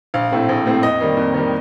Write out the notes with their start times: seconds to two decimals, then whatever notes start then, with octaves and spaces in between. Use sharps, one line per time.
0.14 A#1 F5
0.31 A2 A3 C4
0.49 A#1
0.65 A2 A3 C4
0.83 F2 D#5
1.00 D#3 G3 A#3
1.17 F2
1.34 D#3 G3 A#3